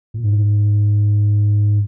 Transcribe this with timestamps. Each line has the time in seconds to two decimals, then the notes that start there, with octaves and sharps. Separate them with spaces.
0.14 A#2
0.23 G#2